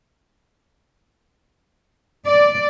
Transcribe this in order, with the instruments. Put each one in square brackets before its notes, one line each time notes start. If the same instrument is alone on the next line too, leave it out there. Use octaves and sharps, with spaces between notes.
[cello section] D5